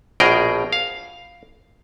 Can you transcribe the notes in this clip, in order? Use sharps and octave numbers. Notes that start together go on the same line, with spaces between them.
A#1 B2 G#4 A#4 G5
F5